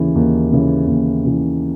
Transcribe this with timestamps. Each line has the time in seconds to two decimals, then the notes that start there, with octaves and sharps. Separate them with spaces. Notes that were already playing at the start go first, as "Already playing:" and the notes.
Already playing: D#2 C#3 E3
0.15 D#2
0.52 C#3 E3
0.87 D#2
1.23 C#3 E3